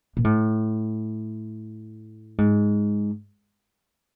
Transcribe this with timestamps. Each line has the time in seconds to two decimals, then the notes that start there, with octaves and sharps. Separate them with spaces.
0.17 A#2
0.24 A2
2.38 G#2